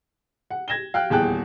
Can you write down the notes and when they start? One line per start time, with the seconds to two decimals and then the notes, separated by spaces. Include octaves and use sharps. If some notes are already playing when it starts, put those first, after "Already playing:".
0.50 F#5
0.68 G#6 A#6 E7 G7
0.94 F5 G5 F6 F#6
1.10 D#1 E2 G#4 G5 A5 F#6